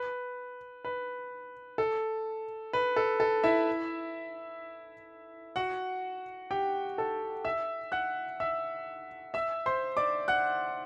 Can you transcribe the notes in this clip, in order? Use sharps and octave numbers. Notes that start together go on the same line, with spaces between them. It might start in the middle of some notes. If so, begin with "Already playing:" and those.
Already playing: B4
B4
A4
B4
A4
A4
E4 E5
F#4 F#5
G4 G5
A4 A5
E5 E6
F#5 F#6
E5 E6
E5 E6
C5 C6
D5 D6
F#5 F#6